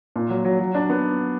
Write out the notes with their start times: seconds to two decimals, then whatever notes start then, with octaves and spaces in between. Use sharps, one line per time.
0.16 A#2
0.30 F#3
0.45 F#3
0.59 F#3
0.75 D4
0.90 B3